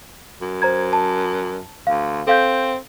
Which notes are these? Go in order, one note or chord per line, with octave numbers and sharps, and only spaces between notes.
F#2
C5 A#5 G#6
A5
D2 F5
C4 A4 F5 G6